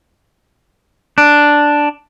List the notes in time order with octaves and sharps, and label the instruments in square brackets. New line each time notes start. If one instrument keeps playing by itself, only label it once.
[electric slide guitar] D4